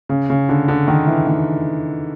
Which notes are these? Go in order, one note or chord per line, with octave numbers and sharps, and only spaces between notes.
C#3
C#3
D3
D3
D#3
E3
D#3